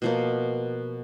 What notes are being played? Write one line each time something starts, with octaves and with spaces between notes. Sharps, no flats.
B2 F3 A#3